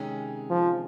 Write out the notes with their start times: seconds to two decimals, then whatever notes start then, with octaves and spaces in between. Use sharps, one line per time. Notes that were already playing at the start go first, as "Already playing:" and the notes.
Already playing: C3 D#3 G#3 C#4
0.50 F3